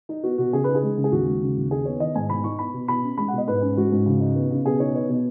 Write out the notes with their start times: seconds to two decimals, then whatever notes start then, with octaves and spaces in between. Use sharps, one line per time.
0.09 D#4
0.23 B3 F#4
0.38 B2 F#4
0.53 C#3 G#4
0.64 D#4 B4
0.75 G#4
0.83 G#3
0.97 C#3
1.04 G#4
1.12 D#2 F#4
1.27 G#3
1.41 C#3
1.57 D#2
1.71 D#4 G#4
1.85 B3 C#5
2.00 D#3 D#5
2.15 G#2 G#5
2.30 B2 B5
2.44 D#4 C#6
2.59 B3 B5
2.74 B2
2.88 B2 B5
3.03 C#4
3.18 G#3 B5
3.28 F#5
3.33 B2
3.38 D#5
3.48 G#2 B4
3.62 C#4
3.76 G#3 F#4
3.92 G#2
4.06 C#3
4.20 D#4
4.35 B3
4.51 C#3
4.66 B2 G#4
4.80 D#4 C#5
4.95 B3 C#5
5.09 B2